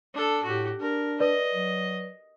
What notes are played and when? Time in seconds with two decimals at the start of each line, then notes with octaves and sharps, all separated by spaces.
0.14 D4 A4
0.43 A2 F#4 G4
0.80 D4 A#4
1.20 B4 D5 D#5
1.52 F#3